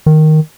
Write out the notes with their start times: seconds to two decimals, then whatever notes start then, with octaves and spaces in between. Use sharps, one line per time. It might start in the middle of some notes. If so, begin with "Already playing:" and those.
0.06 D#3